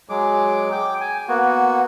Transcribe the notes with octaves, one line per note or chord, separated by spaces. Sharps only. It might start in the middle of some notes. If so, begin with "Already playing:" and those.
F#3 G#3 G#4 D6
G5 D6
G#5
A#3 B3 F#4